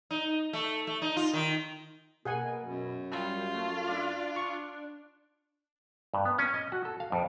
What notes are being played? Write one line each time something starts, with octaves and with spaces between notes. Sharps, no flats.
D#4
A3
A3
D#4
F4
D#3
B2 A#3 G#4 F#5 G#5
F#2
G3 F4
A3
D4
C#6
G2
B3
C#4
D#5
F#4
A4
F5
F2